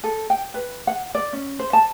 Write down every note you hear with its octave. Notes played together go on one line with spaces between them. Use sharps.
A4
G5
B4
F#5
D5
C#4
C5
A5